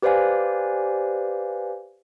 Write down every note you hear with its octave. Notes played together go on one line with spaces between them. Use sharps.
G4 B4 C5 D5 F5 G#5